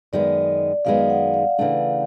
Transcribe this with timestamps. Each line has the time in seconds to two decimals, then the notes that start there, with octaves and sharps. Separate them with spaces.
0.13 F#2 D#3 G#3 B3 D5
0.85 F#2 D#3 G#3 B3 F5
1.10 F#5
1.34 F5
1.58 C#3 E3 A3 D4